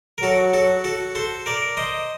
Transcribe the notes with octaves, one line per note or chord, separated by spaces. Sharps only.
A#4
F#3 F#4 A4
F#4 A4
F#4 A4
A4 C5
A#4 D5
C5 D#5